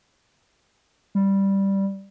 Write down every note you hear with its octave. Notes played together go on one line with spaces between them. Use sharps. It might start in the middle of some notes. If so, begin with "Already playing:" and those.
G3